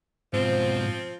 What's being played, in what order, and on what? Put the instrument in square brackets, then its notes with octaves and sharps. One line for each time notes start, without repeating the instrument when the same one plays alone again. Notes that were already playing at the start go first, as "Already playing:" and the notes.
[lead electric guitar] G#2 B2 [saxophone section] F3 C4